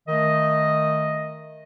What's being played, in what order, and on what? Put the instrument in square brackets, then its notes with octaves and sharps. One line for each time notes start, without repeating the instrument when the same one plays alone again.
[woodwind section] D#3 A3 D#5